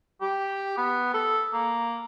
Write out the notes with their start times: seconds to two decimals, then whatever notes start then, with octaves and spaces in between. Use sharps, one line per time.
0.21 G4
0.77 B3
1.14 A4
1.53 A#3